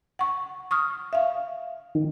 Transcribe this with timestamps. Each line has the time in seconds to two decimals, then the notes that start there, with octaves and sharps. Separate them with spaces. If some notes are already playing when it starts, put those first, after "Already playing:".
0.19 F#5 C#6
0.71 C#6 D#6 F6
1.13 E5 F5
1.95 D#3